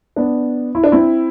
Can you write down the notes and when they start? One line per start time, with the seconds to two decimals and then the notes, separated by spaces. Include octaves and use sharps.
0.16 B3 D4
0.75 E4
0.84 D4
0.92 C4 E4